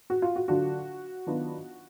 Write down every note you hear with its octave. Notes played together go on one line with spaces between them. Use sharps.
F#4
F4
F#4
D3 F#3 D4 F4 F#4
D#3 F#3 B3 D4 F4